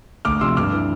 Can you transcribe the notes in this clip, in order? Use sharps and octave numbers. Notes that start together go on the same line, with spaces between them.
D2 D6 F6
C3 F3 C6 E6
G2 D6 F6
E3